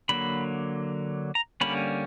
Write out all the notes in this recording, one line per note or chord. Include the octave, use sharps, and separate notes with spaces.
D3 F#3 A#3 B5
A#5
D3 G3 A#3 C#4 B5